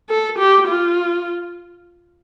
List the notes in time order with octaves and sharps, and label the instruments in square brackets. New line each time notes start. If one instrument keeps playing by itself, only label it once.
[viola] A4
G4
F4